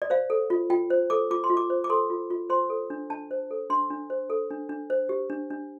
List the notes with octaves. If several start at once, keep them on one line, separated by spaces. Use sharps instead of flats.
D5
C5 F5
A4
F4
F4 G5
C5
A4 D6
F4 D6
C6
F4
D6
C5
D6
A4 C6
F4
F4
C5 C6
A4
D4
D4 A5
C5
A4
D4 C6
D4
C5
A4
D4
D4
C5
G4
D4
D4